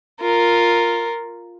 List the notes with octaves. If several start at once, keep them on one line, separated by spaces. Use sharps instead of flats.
F4 A#4